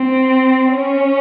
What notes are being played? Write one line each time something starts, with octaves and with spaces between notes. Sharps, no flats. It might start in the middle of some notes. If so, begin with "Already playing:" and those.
Already playing: C4
C#4